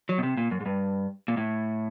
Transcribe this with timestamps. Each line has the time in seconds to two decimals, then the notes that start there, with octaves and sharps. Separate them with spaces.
0.09 F#3
0.18 B2
0.23 C3
0.37 A#2
0.51 F#2
0.60 G#2
0.66 G2
1.28 A#2
1.37 A2